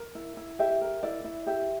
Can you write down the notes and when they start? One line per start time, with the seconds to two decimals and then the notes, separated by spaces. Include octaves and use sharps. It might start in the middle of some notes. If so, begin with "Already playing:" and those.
Already playing: A#4
0.15 E4
0.37 E4
0.59 G4 E5
0.81 A#4
1.03 E4 D5
1.25 E4
1.46 G4 E5